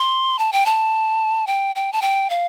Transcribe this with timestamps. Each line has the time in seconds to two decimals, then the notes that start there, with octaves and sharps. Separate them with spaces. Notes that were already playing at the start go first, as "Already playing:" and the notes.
Already playing: C6
0.39 A5
0.52 G5
0.66 A5
1.47 G5
1.76 G5
1.93 A5
2.02 G5
2.30 F5